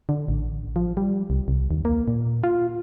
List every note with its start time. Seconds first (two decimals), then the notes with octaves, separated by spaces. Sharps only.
0.09 D3
0.28 A1
0.76 F3
0.97 G3
1.30 C2
1.48 C2
1.71 D#2
1.85 A#3
2.08 A#2
2.44 F4